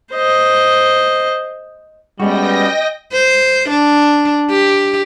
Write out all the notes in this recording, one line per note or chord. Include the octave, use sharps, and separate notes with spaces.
C5 D#5
G3 G#3 B3 C#4 F#4 D#5 G5 A#6
C5
D4
G4